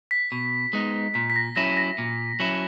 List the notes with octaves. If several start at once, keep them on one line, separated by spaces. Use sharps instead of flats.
B6
B2
G#3 B3 D#4
A#2 B6
B6
A#6
F#3 C#4 E4 A#6
A#6
A#2
F#3 C#4 E4